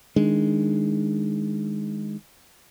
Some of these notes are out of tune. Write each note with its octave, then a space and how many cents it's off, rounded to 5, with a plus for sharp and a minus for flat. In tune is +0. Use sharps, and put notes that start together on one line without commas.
D#3 +0 G#3 +0 D4 +0